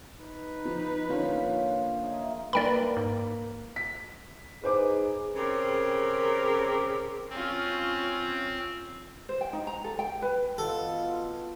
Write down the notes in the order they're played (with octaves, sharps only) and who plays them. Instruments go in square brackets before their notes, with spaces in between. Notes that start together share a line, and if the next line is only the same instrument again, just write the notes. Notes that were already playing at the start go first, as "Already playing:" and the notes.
[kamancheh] D#4 B4
[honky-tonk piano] F3
[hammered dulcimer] A#2 D3 F4 [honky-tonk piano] F3 C#4
[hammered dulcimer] D#4 G#4 E5
[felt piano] A#3 B4 [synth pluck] D5 G5 B5
[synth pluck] G#2
[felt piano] B6
[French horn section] D#4 G#4 [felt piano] B4 C5 D6
[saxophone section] C#3 C4 G4 G#4 A#4
[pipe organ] C4 [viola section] C#4 F4
[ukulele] C5
G5
D#4
A#5
A4
G5
B4
[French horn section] B2 B3 F4 [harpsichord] A4